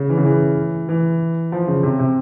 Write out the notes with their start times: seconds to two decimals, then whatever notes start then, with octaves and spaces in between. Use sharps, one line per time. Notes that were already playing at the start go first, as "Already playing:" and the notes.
Already playing: C#3
0.09 E3
0.18 C#3
0.25 E3
0.89 E3
1.52 F3
1.67 C#3
1.83 C3
1.99 C3